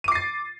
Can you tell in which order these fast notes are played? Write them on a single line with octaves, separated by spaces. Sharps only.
D#7 D6 C7 A6